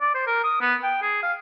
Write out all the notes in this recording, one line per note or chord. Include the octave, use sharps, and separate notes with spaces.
D5
C5
A#4
D#6
B3
G5
G#4
F5